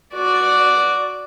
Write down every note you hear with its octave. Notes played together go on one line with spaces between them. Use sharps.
F#4 D5